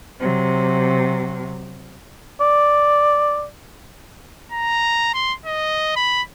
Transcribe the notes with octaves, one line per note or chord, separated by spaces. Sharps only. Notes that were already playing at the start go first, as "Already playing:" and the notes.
C3 F#3
D5
A#5
C6
D#5
B5